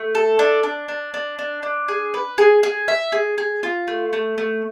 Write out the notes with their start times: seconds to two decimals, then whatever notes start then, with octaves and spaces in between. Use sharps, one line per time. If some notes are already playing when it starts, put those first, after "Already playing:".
Already playing: A3
0.15 A4
0.39 D4
0.63 D4
0.88 D4
1.14 D4
1.39 D4
1.63 D4
1.88 G#4
2.14 B4
2.38 G#4
2.63 G#4
2.88 E5
3.12 G#4
3.38 G#4
3.63 F4
3.88 A3
4.13 A3
4.38 A3